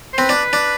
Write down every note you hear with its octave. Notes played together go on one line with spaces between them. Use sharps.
C5
C4 B4
D4
D4